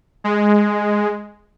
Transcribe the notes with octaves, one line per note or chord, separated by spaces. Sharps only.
G#3